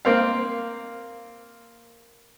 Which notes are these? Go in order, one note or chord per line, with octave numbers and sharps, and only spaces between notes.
A#3 C4 F5